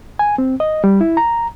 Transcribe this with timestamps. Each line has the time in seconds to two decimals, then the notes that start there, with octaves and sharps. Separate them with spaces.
0.19 G#5
0.38 C4
0.60 D#5
0.84 G3
1.01 E4
1.17 A#5